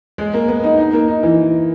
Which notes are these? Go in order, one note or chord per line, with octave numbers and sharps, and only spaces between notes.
G#3
A#3
B3
D#4
D#4
A#3
D#4
E3